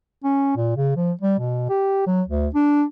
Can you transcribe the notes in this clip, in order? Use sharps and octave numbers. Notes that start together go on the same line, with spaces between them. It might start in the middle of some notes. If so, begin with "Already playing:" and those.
C#4
A#2
C#3
F3
G3
B2
G4
F#3
D2
D4